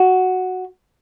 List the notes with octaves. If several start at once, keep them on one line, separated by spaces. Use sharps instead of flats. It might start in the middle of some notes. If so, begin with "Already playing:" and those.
Already playing: F#4